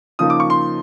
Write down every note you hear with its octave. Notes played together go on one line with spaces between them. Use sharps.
C#3 F3 A#3 D#4 D#6
D6
C#6
C6